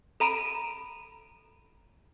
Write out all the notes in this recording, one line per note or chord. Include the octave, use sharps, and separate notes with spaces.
A4 A#5 B5 D7 E7